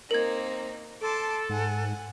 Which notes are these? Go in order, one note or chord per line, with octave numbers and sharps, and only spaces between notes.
A#3 C4 D#4 A#4 G#6
A4 A5 C6 D6
G#2 F#5 G#5